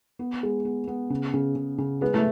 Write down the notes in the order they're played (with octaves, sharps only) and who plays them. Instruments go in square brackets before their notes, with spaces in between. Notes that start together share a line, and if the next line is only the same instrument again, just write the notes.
[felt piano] B3
G#3
B3
B3
C#3
C#3
C#3
C#3
[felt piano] G#3 [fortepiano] B3
[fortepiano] A3